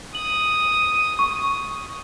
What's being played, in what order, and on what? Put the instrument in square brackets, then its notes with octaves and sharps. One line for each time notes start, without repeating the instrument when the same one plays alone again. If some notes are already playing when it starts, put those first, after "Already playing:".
[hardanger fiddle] D#6 [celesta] F#7
[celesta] C#6